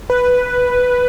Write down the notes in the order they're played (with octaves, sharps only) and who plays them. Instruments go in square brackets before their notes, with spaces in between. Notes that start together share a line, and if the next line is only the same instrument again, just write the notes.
[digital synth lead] B4